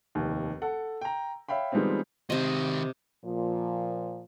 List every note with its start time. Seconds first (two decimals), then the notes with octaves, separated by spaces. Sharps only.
0.15 F1 D#2
0.62 A4 F#5
1.01 G5 A#5
1.49 C#5 E5 F5 G5 B5
1.72 D#3 F3 G3 G#3 B3 C4
2.30 C3 D#3 C5 D#5
3.25 A#2 F3